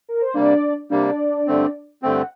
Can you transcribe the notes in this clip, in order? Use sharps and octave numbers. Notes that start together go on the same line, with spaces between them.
A#4
C5
C3 G3 A#3 D4 D5
C3 G3 A#3 D4 D5
G2 D3 A3 C4
G2 D3 A3 C4 G5
F#5